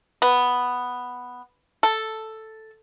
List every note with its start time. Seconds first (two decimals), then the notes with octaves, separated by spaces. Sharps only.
0.22 B3
1.83 A4